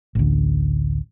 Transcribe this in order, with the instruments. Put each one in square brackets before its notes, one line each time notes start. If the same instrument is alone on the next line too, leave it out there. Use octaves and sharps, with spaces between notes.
[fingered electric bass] A1 D2